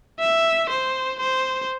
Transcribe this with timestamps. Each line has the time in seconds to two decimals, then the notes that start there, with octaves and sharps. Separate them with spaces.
0.20 E5
0.70 C5
1.20 C5